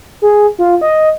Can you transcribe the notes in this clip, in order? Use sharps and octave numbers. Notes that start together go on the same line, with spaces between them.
G#4
F4
D#5